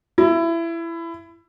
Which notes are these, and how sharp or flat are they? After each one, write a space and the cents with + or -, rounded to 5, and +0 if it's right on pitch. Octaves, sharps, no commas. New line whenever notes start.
E4 +20